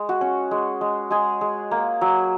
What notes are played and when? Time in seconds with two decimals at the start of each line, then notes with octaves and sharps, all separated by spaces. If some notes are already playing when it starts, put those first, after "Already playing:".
Already playing: G#3
0.09 F#4
0.21 C#4
0.51 G#3
0.81 G#3
1.11 G#3 G#4
1.41 G#3
1.71 A#3
2.01 F#3